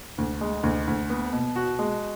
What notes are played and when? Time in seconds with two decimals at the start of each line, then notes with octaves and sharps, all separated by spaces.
0.18 D2
0.41 G#3
0.63 D2
0.87 D2
1.10 B3
1.33 B2
1.56 F#4
1.79 G#3